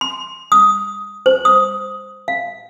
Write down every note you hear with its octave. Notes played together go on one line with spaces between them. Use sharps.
C6
D#6
C5
D#6
F5